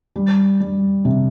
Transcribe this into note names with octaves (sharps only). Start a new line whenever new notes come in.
G3
G3
C3